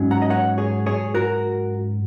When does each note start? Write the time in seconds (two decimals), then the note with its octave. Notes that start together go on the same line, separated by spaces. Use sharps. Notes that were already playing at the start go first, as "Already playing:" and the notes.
Already playing: G#2 F#3 C#4
0.11 F#5 A#5
0.22 D#5
0.30 C#5 F#5
0.58 G#4 C#5
0.86 G#4 C#5
1.14 F#4 A#4